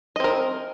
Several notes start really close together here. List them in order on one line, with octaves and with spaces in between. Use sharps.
D#5 C4 A#4